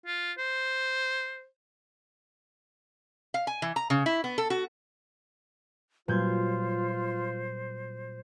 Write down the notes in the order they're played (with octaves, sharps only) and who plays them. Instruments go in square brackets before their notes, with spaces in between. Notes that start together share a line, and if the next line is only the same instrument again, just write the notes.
[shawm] F4
C5
[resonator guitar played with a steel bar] F5
G#5
E3
A#5
C#3
E4
B3
A4
F#4
[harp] A#2 G6 G#6 [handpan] F#3 G3 B4 [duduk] F4 [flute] C5